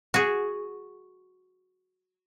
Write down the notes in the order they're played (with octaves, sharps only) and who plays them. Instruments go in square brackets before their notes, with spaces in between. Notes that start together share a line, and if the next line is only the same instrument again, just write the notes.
[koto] F#4 G#4